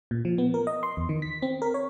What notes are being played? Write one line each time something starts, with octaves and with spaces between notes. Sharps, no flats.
A#2
F3
B3
A#4
D#5
C6
E2
D#3
B6
C4
A#4
C#5